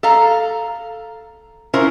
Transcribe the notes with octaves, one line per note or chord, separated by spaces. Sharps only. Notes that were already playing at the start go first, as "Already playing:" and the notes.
A4 F5 A#5
C#4 E4 F4 A#4 C5